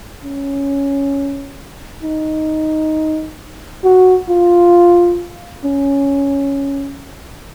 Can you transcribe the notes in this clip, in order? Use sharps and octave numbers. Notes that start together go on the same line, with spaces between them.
C#4
D#4
F#4
F4
C#4